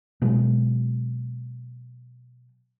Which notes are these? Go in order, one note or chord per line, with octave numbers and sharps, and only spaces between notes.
B2 F#3 G#3